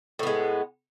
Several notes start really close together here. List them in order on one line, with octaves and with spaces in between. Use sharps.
A2 B3 G#3